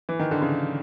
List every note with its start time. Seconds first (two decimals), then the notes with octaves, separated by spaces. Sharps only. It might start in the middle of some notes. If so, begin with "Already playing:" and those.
0.09 E3
0.19 D#3
0.31 D3
0.42 C#3